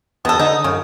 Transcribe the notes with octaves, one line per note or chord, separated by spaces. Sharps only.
E2 B2 A4 D#6
D3 D#4
F#2 C#3